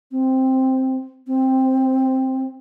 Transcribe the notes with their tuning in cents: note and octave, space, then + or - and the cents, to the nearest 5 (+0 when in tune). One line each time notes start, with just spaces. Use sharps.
C4 +0
C4 +5